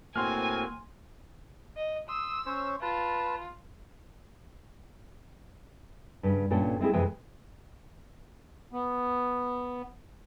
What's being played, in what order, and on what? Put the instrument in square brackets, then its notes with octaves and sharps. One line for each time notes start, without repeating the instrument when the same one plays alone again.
[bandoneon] A2 C4 F#4 [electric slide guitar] A#3 [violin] G#5 [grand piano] C6 F6
[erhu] D#5
[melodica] C6 D#6 [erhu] E6
[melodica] C#4 C5 C#5
[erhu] F4 [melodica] B4 A5
[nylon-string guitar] G2 C#3
G2 A#2 C#4 A4 G5
G#3 C4 E4 G#4
F2 C3 E3 G#3 D#5 G5
[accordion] B3